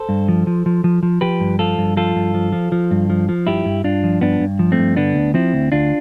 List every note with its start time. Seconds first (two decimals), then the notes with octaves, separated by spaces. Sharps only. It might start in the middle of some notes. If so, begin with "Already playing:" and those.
Already playing: A4 C5
0.09 G2
0.28 F3
0.47 F3
0.66 F3
0.84 F3
1.03 F3
1.21 F3 G4 B4
1.41 G2
1.59 F3 F4 A4
1.78 G2
1.97 F3 F4 A4
2.16 G2
2.34 F3
2.52 F3
2.72 F3
2.91 G2
3.10 F3
3.29 F3
3.47 G2 E4 G4
3.66 G2
3.84 G2 D4 F4
4.04 F3
4.21 G2 B3 D4
4.40 G2
4.59 F3
4.72 A3 C4
4.79 G2
4.96 D3 B3 D4
5.15 D2
5.34 F3 C4 E4
5.54 D2
5.72 D2 D4 F4